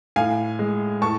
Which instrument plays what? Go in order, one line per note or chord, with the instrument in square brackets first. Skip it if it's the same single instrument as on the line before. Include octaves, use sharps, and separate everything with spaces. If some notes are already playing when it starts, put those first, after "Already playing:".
[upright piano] A2 F5 G#5
G#3
A2 A5 C#6